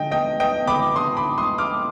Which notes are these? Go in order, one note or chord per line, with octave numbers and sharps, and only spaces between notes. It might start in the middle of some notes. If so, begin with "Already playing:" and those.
Already playing: D3 D#5 G5
B3 D#5 G5
B3 D#5 G5
B3 B5 D6
B3 C6 D#6
B5 D6
B3
C6 D#6
B3
D6 F6